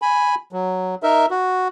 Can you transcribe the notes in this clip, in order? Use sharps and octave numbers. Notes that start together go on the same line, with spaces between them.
G#5 B5
F#3
D#4 A#4 E5
F#4